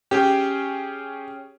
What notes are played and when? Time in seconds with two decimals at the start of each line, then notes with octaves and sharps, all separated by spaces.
0.11 C#4 G4 G#4 G5